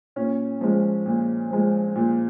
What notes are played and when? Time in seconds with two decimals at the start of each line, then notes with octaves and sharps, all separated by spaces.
0.16 A#2 C#4
0.61 F3 G#3
1.06 A#2
1.51 F3 G#3
1.96 A#2